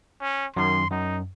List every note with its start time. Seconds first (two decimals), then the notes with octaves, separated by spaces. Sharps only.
0.21 C#4
0.57 F#2 D#3 C6
0.91 F#2 D#4